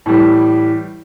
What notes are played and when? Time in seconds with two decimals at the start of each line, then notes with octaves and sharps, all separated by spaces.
0.06 A2 E3 G3